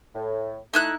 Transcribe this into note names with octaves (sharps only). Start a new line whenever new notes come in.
A2
A3 D#4 E4 F#6